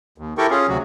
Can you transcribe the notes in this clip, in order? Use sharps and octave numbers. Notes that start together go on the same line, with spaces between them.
D#2
E4 G4 A4 A#4 G5 C#6
C#4 F4 G#4
D2 C3 F#3 F#4